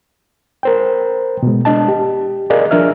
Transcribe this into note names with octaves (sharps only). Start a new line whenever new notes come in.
A#4 C5 G5
B2 G#3
G#3 D4 D#5 A5
G4
G#4 A#4 D5 D#5 F5
F3 D4 A#4 E5 F6